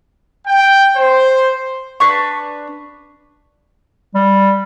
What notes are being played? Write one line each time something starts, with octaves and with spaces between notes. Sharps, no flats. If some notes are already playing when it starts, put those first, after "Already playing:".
G5
C5
D4 B4 C#6
G3